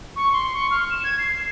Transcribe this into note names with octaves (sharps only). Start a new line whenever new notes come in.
C#6
C6
C#6
F6
E7
G#6
C7